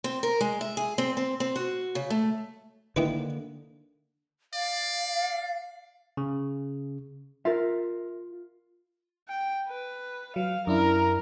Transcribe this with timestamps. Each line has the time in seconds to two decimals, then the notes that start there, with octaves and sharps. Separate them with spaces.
0.04 C4
0.23 A#4
0.41 G#3
0.61 E5
0.77 G#4
0.98 C4
1.17 C4
1.40 C4
1.56 F#4
1.95 C#3
2.10 A3
2.96 D3 D#3 A#3 E4 B4
4.54 D5 F5
6.17 C#3
7.45 F4 A#4 E5
9.28 G5
9.67 B4
10.36 F#3 F5
10.67 F#2 D4 E4 A#4